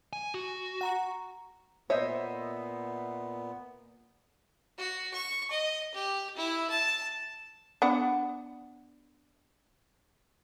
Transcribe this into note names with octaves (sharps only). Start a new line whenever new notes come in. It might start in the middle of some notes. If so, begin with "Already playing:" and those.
G#5
F#4
F#5 A#5 C#6
A#2 B3 C5 C#5 D#5 E5
F#4
C#6
D#5
G4
E4
A5
B3 D4 F#5